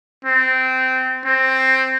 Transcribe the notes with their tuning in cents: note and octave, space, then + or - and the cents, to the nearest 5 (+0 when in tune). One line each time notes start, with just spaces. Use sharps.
C4 -15
C4 +10